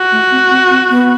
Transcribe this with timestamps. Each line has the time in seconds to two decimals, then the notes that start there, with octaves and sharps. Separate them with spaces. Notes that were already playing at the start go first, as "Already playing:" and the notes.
Already playing: F#4
0.12 A3
0.31 C4
0.50 C4
0.70 C4
0.90 B3